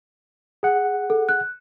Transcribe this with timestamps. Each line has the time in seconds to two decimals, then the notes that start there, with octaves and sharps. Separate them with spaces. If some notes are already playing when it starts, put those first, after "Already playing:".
0.63 G#4 F#5
1.10 A4
1.29 F#6